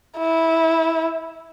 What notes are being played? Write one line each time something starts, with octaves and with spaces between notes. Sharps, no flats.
E4